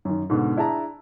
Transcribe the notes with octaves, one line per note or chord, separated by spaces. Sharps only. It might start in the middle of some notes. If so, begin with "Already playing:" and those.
F#2 D#3
G#2 B2 D3
D4 E4 G#4 A5 A#5